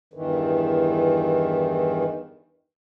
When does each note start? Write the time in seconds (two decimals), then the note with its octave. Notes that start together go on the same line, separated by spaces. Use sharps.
0.14 E2 G2 D#3 E3